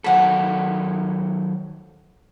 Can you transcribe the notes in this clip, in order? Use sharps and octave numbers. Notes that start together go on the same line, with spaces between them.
D#3 F#3 A4 F#5 B5